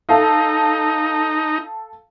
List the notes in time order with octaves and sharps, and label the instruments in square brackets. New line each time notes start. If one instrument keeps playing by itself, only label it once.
[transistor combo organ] D#4 [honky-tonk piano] A4 F5